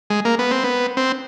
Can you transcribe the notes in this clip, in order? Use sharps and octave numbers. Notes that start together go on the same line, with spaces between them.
G#3
A#3
B3
C4
B3
C4